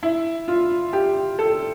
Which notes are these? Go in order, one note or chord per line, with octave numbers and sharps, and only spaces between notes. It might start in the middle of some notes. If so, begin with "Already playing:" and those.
E4
F4
G4
A4